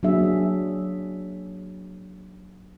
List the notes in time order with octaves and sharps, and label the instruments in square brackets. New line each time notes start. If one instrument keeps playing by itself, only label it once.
[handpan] F#3 A#3 D4 G#4 E5